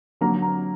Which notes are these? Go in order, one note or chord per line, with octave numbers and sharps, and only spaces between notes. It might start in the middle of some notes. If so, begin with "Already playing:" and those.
D3 F#3 A#3 A#5
A#5